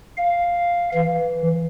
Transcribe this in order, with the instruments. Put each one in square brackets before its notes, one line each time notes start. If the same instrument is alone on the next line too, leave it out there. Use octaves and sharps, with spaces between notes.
[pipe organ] F5
E3